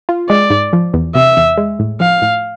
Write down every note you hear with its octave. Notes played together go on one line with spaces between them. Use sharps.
F4
G#3 D5
G#2
F3
E2
C3 E5
E2
G#3
A2
F3 F5
A2